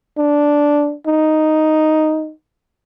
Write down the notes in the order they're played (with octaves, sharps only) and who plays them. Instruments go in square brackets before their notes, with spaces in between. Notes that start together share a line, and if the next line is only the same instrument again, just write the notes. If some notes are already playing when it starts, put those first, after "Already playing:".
[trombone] D4
D#4